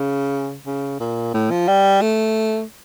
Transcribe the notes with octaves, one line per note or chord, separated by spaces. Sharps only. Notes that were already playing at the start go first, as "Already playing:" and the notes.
Already playing: C#3
C#3
A#2
A2
F3
G3
A3